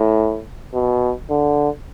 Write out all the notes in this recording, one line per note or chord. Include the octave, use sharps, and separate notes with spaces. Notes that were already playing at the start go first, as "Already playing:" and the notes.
Already playing: A2
B2
D3